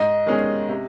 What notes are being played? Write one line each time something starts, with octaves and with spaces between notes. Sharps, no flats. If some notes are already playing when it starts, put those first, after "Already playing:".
Already playing: G#2 D#5
D#3 G#3 C#4 G#4
C3